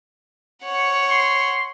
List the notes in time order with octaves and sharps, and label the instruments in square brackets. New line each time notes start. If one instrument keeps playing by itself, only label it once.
[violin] C#5 F#5
[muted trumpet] C6